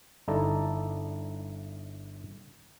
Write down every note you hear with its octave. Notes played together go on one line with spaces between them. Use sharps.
G1 D#4 E4 A4 D5 A#5